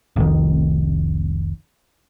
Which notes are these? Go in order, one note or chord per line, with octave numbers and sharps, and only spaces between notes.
F1 C2 F2 D#3